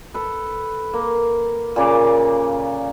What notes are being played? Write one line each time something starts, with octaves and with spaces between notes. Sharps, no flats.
A4 B4
A#3
A#2 C#3 D6